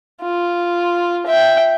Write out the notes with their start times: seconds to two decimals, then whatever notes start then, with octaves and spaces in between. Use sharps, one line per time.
0.21 F4
1.26 E5 G5